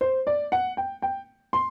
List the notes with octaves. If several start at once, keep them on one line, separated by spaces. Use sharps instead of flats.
C5
D5
F#5
G5
G5
C6